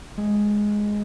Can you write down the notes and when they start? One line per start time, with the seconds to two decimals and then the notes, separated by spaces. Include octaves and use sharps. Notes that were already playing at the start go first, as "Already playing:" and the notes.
0.18 G#3